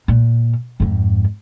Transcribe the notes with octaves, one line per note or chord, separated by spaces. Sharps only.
A#2
F2 G#2